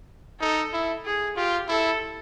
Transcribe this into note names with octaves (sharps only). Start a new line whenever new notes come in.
D#4 A4
E4
G#4
F4 G4
E4 A4